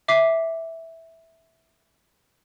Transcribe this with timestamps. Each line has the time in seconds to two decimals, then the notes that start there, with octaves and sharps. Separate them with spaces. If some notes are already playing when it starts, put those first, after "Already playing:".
0.08 E5 D6 B6 C7